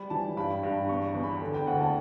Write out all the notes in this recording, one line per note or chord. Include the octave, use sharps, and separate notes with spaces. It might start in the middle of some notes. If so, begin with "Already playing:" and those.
Already playing: G3 B5
E3 A5
G2 B5
G2
E2 C#6
C#6
E2
B5
D3
G5
D2 F#5
A5